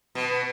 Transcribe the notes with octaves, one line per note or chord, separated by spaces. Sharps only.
B2